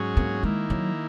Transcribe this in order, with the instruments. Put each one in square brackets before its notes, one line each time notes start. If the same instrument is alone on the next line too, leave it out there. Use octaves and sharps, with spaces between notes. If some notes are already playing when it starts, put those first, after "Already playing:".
Already playing: [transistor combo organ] G#2 F#3 C#4 G#4
[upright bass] A#3
[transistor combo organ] D#3 A#3 E4 [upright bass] G#3
[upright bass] F#3